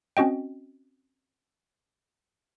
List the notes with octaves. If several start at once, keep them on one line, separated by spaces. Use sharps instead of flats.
C4 C#4 F#4 D#5 G5